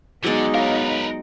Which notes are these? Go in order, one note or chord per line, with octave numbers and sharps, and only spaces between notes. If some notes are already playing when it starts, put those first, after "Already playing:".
D3 F#3 G#3 B3 D#4 D5
A#4 B4 C#5 D#5 F5